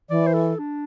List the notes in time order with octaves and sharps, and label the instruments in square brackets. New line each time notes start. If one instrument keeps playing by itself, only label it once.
[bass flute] E3 [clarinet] D5
[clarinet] C5
A4
D4